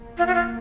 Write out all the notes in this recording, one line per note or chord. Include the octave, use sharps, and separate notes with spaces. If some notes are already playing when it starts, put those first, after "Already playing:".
Already playing: A#3
F4
F#4
F4